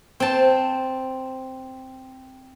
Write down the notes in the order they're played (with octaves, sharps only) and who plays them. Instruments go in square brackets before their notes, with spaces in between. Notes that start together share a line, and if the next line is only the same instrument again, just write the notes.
[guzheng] C4 A5